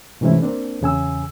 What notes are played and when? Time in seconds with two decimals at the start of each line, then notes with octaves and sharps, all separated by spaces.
0.21 G#2 C3 E3 A3 C#4 E4
0.42 A#3 C4 D4
0.81 E2 C#3 G#5 E6